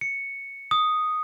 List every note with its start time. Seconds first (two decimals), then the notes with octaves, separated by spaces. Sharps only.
0.01 C#7
0.71 D#6